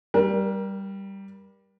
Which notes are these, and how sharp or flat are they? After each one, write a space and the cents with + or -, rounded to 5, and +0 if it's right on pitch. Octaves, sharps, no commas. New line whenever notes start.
G3 +0 A#4 +30